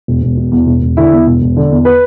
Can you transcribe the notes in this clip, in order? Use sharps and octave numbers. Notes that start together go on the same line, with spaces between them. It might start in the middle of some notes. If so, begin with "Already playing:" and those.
E1
E1
B2
E2
E1
E1
D3 E4
E2
E1
E1
D3
E2
B4